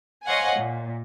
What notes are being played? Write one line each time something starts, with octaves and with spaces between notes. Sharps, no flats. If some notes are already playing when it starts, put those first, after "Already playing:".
C5 C#5 D#5 F5 F#5 G#5
A#2